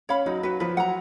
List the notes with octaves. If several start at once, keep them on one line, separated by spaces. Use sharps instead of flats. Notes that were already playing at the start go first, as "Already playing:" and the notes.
C#4 C#5 F5 B5
F#3 D#4
F#3 F#4 B4
F3 B4
F#3 F#5 A#5